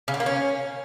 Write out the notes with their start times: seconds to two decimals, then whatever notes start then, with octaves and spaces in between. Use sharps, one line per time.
0.08 C#3
0.14 D3
0.20 A#3
0.26 C#4